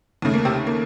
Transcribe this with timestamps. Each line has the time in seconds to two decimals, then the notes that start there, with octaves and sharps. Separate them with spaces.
0.22 D#2 C#3 A3
0.34 A#3
0.45 C3 C4
0.67 A#3